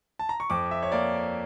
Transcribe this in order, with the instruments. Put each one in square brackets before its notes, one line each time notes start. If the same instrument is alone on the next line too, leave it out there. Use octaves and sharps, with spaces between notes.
[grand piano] A5
A#5
C#6
F2 D6
E5
C#5
A#3 D5